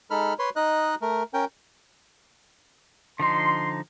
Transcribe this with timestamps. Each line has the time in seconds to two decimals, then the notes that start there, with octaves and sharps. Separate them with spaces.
0.11 G#3 D#4 A4 B5 F6
0.39 B4 C#5 C6
0.56 D#4 D#5 F#6
1.02 A3 A#4
1.34 C#4 A#4 G5
3.20 D3 F3 D#4 C6